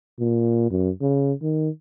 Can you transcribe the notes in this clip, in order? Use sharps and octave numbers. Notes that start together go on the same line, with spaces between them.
A#2
F#2
C#3
D#3